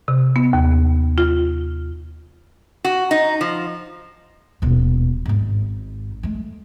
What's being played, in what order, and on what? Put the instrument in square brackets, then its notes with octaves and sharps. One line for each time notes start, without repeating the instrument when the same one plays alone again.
[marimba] C3
B3
D#2
F4
[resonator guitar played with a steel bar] F#4
D#4
F3
[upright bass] D#1 B2
G#1 G#2
G#3 A3